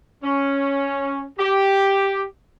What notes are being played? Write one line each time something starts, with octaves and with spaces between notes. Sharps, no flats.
C#4
G4